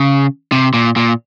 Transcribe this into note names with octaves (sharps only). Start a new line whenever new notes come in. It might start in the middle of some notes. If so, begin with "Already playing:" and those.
Already playing: C#3
C3
A#2
A#2